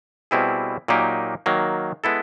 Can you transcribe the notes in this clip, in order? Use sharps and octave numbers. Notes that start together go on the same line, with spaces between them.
B2 G3 C4 E4 G#4
A#2 F#3 A#3 D#4 G4
D#3 F#3 A#3
G#3 B3 E4 A4